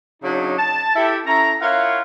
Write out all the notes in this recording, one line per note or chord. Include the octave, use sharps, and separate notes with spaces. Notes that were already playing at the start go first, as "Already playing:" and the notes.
C#3 F#3 D4 D#4
A5
E4 G4 A4
C#4 E4 A4 A#5
E4 F4 A#4 C#5 F5 F#5